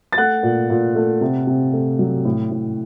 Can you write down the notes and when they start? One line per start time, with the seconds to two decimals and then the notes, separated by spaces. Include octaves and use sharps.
0.13 A6
0.18 A3 F#5 F#6
0.43 A#2
0.70 A#2
0.96 A3
1.21 C3
1.47 C3
1.73 A3
1.99 F#3
2.25 A2
2.51 A2